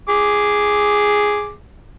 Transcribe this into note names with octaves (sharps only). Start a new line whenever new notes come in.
G#4 D6